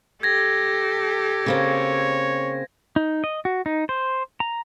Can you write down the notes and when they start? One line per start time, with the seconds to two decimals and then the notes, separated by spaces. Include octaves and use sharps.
0.23 G4 A4 G#6 A#6
1.46 C#3 A#3 C4 C#5
2.96 D#4
3.24 D#5
3.45 F#4
3.66 D#4
3.89 C5
4.40 A#5